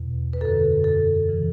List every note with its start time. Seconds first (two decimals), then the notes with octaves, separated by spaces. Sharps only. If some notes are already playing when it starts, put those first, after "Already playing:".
Already playing: E2 B2
0.33 B4
0.41 F#2 D3 A4
0.84 A4
1.29 C#3 E3